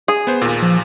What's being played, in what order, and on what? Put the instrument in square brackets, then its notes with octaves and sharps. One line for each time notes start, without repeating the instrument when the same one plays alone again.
[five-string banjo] G#4
[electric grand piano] B3 C5
D#2 A#2
[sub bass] F3